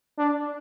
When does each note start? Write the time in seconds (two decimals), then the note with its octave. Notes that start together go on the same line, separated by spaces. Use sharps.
0.18 D4